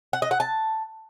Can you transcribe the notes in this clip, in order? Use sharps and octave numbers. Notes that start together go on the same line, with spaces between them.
F#5
D#5
F#5
A5